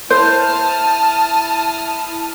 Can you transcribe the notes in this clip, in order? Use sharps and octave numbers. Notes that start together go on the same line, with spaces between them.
E4 C5 A5 D#6 F6